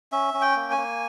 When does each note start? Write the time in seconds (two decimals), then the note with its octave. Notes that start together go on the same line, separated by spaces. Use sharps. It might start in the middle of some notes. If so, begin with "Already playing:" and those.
0.12 C#4 E5
0.34 C#4
0.42 G5
0.56 A#3
0.71 G#5
0.78 A#3